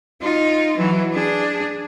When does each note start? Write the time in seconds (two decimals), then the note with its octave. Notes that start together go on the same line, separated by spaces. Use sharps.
0.21 D#4 F4
0.77 E3 F#3
1.13 D4 G#4